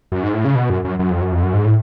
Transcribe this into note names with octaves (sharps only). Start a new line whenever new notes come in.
F#2
G#2
A2
C#3
B2
F#2
F#2
F#2
F2
F#2
F2
F#2
G#2
A2